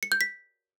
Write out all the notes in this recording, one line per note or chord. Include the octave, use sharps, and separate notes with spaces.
C#7
G6
B6